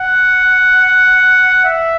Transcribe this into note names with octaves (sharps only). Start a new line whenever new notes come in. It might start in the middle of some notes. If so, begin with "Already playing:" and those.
Already playing: F#5
E5